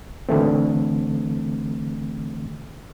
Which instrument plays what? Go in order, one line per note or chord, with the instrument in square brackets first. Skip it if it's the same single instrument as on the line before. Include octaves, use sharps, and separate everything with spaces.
[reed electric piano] D3 E3 A3 C4